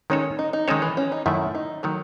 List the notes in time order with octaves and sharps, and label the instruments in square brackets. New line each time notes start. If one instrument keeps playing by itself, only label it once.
[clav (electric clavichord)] D#3 G#3 D#4 A4 C#5 [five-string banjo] C#4
[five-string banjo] D#4
D#4
[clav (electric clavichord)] D#3 G#3 D#4 A4 C#5 [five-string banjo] C#4
[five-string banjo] E3
C#4
D#4
[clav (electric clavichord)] F#2 D#3 A3 [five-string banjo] E4
[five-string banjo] D#4
[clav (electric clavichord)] D#3 A3 [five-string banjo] F#3